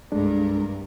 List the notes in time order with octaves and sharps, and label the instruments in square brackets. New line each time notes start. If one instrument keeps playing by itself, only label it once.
[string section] C2 G2 A#4 [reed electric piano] G#3 A3 D4